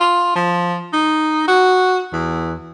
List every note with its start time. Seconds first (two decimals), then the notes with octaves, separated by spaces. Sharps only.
0.01 F4
0.36 F3
0.93 D#4
1.48 F#4
2.13 E2